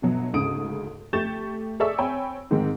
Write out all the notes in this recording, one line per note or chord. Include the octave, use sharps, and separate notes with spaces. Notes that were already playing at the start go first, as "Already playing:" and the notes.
G1 B2 F#3
D2 G#2 C#3 D#6 D7
A3 G4 C#6 G6 A6 E7
G#4 A4 D5 E5 C#6 E6
C4 C#5 G5 G#5 B5
G#2 D#3 G#3 C4